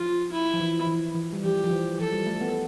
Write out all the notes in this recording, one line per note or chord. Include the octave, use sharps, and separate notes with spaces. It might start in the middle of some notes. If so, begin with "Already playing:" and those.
Already playing: F3 F4
E4
F3
E3
E3
E3
G3
F3 G4
F3
E3
F3 A4
G3
A3
B3